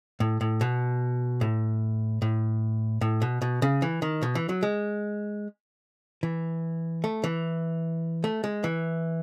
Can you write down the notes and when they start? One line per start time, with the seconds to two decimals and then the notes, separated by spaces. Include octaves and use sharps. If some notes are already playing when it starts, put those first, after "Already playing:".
0.20 A2
0.41 A2
0.61 B2
1.41 A2
2.22 A2
3.01 A2
3.22 B2
3.42 B2
3.62 C#3
3.82 E3
4.02 D#3
4.23 B2
4.35 E3
4.49 F#3
4.63 G#3
6.23 E3
7.04 A3
7.24 E3
8.24 A3
8.44 G#3
8.64 E3